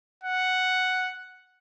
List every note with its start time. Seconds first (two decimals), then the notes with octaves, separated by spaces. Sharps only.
0.23 F#5